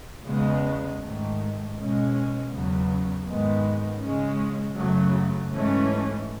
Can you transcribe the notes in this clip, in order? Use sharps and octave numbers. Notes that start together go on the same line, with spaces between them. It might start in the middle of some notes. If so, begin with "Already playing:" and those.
E2 C#3 G#3 B3
G#2 D#3 A3
B2 G#3 C#4
E2 C#3 F#3 B3
G#2 D#3 G#3 B3
C#3 G#3 C#4
F#2 C#3 F#3 A3
G#2 E3 A3 C#4